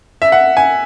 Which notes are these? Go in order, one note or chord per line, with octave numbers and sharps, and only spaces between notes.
E5
F#5
G#5